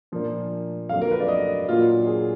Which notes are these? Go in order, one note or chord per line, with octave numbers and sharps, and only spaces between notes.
A#2 F3 A#3 D4
F2 D3 F#3 A#3 F5
A#4
B4
D5
D#5
A#2 F#3 A#3 D4 F4
G#4